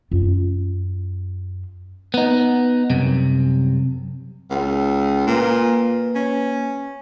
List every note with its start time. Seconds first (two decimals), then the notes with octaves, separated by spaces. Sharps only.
0.11 F#2 F4
2.14 B3 D#4
2.90 C2 F#2 C3
4.50 C#2
5.27 A#2 A#3 B4
6.15 C#4